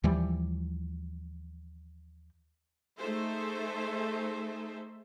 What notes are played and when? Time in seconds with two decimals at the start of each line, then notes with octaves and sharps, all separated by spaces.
0.04 D#2 E3 F3 G3
2.98 A3 D#4 G#4 A4 C5 E5